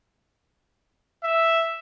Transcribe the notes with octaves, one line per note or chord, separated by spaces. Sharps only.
E5